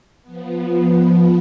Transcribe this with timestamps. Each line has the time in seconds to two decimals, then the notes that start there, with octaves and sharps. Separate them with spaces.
0.22 F3 B3